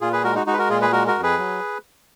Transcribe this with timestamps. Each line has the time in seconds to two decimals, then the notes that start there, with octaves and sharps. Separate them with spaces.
0.01 A#2 F4 G#4
0.12 G#4 B4
0.23 G#3 F#4 A#4
0.35 D#4 F#4
0.46 G#3 D#4 F#4
0.53 B4
0.58 F#4 A#4
0.69 A#2 F4 G#4
0.81 G#4 B4
0.92 G#3 F#4 A#4
1.07 F#4 A#4
1.15 F2
1.23 G#4 B4
1.38 F#3